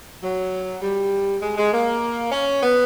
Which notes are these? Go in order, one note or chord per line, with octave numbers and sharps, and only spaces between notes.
F#3
G3
G#3
G#3
A#3
C#4
B3